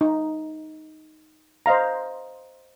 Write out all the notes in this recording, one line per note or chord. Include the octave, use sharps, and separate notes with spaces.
D#4
C5 D#5 F5 A#5